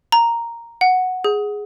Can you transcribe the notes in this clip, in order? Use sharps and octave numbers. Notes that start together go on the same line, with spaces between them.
A#5
F#5
G#4